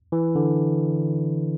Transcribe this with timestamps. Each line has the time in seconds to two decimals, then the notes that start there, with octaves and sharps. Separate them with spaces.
0.12 E3
0.35 D3